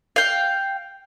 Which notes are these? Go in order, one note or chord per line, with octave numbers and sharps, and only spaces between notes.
F5 G5